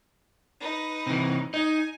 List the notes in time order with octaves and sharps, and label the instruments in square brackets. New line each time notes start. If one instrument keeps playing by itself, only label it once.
[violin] D#4 B4
[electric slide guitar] C3 E3
[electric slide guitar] D#4 D#5 [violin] G#5